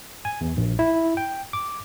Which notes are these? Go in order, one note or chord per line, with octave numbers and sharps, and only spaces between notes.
G#5
E2
A#1
E4
G5
D6